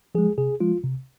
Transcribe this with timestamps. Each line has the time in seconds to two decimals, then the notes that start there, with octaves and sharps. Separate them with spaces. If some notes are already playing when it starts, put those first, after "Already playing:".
0.15 F3 G#3 G#4
0.38 C3 G#4
0.60 F3 G#3 F4
0.83 C3